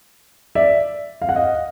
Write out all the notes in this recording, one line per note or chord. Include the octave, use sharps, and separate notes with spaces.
D5 E5
F5
F#5
D#5 F5